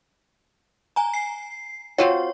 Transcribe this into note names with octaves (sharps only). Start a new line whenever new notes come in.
G#5 A#5
C7
C4 F4 F#4 C#5